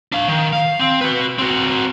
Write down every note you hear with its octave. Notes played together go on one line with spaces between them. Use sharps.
D4 F5
D#3
F5
C4
F#4 B4
C4 F#4